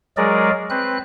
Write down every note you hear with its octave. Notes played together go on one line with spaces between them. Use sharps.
F#3 G#3 G#4 A#4 D5
C4 B4 F#6